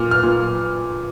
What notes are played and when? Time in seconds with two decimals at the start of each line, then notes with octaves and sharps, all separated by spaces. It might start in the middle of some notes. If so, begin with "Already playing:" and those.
Already playing: A#2 F6
0.11 F6
0.23 A#2